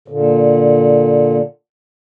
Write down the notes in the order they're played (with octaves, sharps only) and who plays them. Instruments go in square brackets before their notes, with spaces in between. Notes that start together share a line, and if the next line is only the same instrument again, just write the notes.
[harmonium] A#2 D3